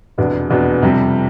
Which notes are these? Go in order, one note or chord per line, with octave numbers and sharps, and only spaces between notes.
F1 E2 B2 B3 D4
F1 E2 B2 B3 D4
F2 C3 G3